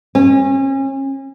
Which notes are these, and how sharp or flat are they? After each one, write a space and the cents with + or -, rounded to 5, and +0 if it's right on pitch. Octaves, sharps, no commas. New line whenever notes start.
C#4 -35